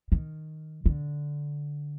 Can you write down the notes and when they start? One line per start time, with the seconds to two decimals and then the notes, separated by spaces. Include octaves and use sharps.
0.12 D#3
0.86 D3